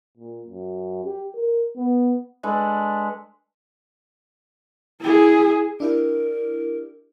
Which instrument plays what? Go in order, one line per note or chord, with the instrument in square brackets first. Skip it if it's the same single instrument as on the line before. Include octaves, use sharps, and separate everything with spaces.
[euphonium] A#2
F#2
G4
A#4
B3
[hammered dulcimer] G#3 D4 A4 B4
[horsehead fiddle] E4 G#4
[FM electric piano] D4 E4 G4 [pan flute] A#4